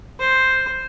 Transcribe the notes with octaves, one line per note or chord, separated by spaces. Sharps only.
C5